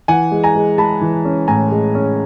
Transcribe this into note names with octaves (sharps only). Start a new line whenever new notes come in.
E3 F#5 G#5
G#3
G#5 A#5
G#3
G#3 A5 B5
E3
C#4
A2 G#5 A#5
G#3
C#4